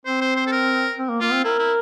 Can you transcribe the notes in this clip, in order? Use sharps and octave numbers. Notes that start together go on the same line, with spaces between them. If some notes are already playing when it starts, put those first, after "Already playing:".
C4 C5
C5
C5
A4
A#4
C4
A#3
A#3 F4
C4
E4 A#4
E4